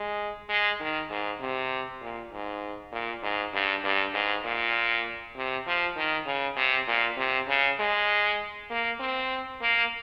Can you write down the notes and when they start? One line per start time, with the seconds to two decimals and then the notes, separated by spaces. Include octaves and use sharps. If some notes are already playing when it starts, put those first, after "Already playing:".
Already playing: G#3
0.49 G#3
0.80 D#3
1.11 G#2
1.41 C3
2.01 A#2
2.32 G#2
2.92 A#2
3.23 G#2
3.54 G2
3.84 G2
4.14 G#2
4.44 A#2
5.36 C3
5.67 F3
5.97 D#3
6.26 C#3
6.57 C3
6.88 A#2
7.18 C3
7.48 C#3
7.80 G#3
8.70 A#3
9.00 C4
9.62 A#3